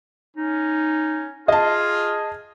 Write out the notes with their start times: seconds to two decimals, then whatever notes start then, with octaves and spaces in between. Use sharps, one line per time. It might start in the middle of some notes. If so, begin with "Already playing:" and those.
0.37 C#4 D#4
1.48 F4 G#4 D#5 A5